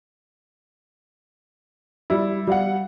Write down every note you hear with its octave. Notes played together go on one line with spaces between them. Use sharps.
G3 E4
G3 F5 F#5